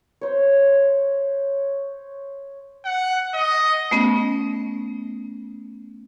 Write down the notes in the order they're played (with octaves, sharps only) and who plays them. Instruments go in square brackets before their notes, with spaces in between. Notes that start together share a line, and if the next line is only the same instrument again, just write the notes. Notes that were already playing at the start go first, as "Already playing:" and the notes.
[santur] C5 C#5
[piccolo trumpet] F#5
D#5
[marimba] A3 B3 C#4